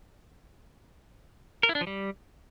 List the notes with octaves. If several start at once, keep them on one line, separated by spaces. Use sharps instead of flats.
A#4
E4
D4
F3
G3